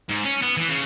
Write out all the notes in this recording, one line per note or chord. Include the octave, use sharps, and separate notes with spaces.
G#2
C#4
B3
E3
C#3